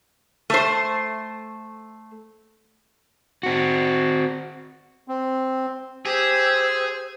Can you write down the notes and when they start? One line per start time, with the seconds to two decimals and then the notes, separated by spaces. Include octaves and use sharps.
0.50 A3 C5
3.43 C4 F#4
5.08 C4
6.05 G4 G#4 C5 E6